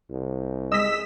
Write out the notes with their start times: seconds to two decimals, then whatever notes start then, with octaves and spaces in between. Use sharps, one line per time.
0.10 C2
0.72 G#3 D#5 E6 B6